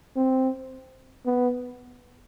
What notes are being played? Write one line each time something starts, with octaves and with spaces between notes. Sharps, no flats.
C4
B3